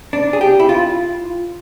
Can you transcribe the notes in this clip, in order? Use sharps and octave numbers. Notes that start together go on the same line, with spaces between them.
D4
G#4
G4
E4
F4